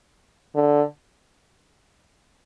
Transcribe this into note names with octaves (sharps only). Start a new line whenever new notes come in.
D3